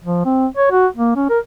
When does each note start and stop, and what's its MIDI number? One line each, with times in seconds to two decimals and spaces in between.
0.04 0.23 53
0.25 0.47 60
0.57 0.70 73
0.71 0.87 66
0.96 1.15 58
1.16 1.28 61
1.30 1.39 70